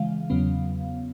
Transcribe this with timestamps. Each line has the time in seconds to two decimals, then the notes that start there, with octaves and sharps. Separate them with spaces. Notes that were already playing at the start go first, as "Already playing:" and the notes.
Already playing: C#3 E3 G#3 F5
0.30 E2 C#3 F#3 B3